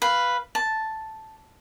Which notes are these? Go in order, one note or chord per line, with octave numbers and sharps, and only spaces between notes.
B4 F5
A5